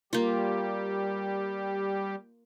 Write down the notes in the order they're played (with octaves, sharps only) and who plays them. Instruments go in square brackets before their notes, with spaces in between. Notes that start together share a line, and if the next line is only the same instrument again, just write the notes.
[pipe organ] G3 G4 [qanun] A#3 F4